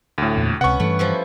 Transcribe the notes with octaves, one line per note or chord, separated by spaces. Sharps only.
D2 A2
E2 A#2
C#2 C3 B3 C#4 F#5 C#6
G2 E3 A3
F3 G3 E4